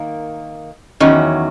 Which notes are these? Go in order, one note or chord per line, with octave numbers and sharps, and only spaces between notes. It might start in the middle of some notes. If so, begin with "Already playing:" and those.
Already playing: D#3 A#3
E2 D#3 F#3 C#4